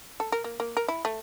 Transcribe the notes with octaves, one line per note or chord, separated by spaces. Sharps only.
A4
A#4
A#3
A#3
A#4
E4
A3